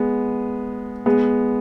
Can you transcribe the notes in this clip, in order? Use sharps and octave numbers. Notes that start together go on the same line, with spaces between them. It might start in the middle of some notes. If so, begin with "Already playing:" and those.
Already playing: G#3 B3
G#3 B3